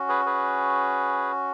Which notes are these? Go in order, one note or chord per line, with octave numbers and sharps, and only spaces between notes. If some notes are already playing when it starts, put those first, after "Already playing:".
Already playing: C#4 F#4
G#4 B4
G#4 B4